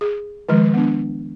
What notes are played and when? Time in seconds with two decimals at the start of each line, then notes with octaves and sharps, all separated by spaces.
0.01 G#4
0.49 D#3 F3 G#3
0.74 B3 D4